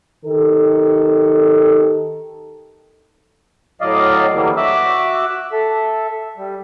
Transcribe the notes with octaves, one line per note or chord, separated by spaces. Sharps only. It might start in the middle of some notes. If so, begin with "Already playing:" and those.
D#3 G4 A4
A2 F#3 D5 D#5 F5
D3 E3 F#3 G3 A#3
F#4 E5 D6 E6 F#6
A4 E5
G3